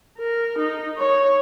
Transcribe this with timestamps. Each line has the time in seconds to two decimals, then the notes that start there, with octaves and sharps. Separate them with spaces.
0.18 A#4
0.59 D#4
0.98 C#5